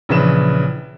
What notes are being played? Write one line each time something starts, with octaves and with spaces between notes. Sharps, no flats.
A#1 C#3 E3 B4 E7